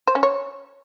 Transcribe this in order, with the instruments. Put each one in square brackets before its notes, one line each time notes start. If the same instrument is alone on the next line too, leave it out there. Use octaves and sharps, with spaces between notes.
[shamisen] C5
C#4
C#5